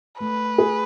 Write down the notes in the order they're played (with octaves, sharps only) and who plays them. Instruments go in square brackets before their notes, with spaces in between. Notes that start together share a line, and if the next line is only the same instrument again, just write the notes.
[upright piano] A3 [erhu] B4
[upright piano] G#4